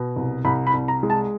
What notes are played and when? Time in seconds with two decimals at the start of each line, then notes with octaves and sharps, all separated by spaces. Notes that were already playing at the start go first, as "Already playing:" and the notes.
Already playing: B2
0.16 C2
0.45 C2 B5
0.67 B5
0.74 C2
0.88 A#5
1.03 G#3
1.10 A5